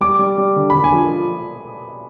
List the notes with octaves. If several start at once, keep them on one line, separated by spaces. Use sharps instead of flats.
G3 D6
G3
G3
D3
D3 B5
G#5
F3